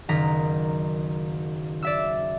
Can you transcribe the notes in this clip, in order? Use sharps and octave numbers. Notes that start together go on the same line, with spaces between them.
F#1 D#3 A#5 B6
D5 E5 E6